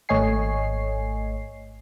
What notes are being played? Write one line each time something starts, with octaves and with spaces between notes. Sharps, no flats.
G#1 A3 C#5 D#5 G#5 C7